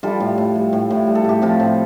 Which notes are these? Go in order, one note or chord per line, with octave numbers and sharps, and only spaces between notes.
G3 F4 A4
A2
A2
G3
A2
A2
G3
A4
A2 G4
F3 C4 F4
A2